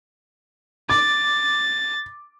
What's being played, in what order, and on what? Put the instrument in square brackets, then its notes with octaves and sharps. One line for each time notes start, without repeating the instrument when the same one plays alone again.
[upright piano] D6 [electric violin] A6